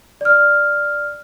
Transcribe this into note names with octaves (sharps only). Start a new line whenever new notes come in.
D5 F6